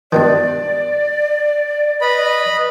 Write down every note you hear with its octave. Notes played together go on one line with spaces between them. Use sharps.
G2 B2 D#3 D5
B4 D#5 B5